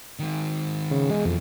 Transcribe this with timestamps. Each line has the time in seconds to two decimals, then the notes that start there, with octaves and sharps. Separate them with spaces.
0.19 D#3 G#3
0.91 C#3
1.10 B2 E3 G#3
1.25 F2